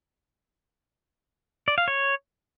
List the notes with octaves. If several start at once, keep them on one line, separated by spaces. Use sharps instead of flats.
D5
F5
C#5